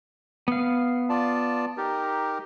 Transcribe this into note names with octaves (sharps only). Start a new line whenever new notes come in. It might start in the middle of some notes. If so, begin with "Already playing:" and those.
B3 F5
F4 D5 A5
D#4 G4 A#4